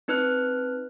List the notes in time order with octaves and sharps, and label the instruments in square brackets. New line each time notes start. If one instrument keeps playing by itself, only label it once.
[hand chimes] C4 D#4 B4 F6 F#6